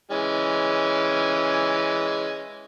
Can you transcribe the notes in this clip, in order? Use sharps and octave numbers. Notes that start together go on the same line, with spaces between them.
E3 G#3 C#4